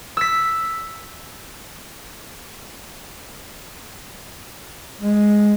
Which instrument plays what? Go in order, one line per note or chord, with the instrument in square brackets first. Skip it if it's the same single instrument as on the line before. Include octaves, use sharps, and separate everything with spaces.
[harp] E6 B6
[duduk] G#3